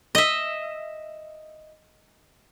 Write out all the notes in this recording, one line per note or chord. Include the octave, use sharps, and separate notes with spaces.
D#5 E5